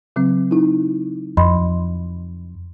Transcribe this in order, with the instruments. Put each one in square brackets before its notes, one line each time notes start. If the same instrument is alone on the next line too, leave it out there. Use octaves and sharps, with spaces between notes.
[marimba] C#3 F#3 C4
D#4 E4
[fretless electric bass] F2 [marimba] D#5 B5 C6